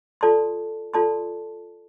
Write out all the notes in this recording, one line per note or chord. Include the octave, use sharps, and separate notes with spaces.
F4 A4 D5 A5 C6
F4 A4 D5 A5 C6